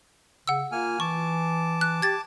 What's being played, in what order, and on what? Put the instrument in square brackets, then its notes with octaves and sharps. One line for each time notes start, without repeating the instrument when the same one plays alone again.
[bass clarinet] C#3 [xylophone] F#5 E6
[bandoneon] A#3 G#5 F6 [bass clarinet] F4
[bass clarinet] E3 [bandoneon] A5 D6 [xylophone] C#6
[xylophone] F#6
[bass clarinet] G4 [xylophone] G#6 A6